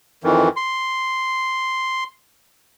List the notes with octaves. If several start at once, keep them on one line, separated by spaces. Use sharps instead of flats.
F2 D#3 E3
C6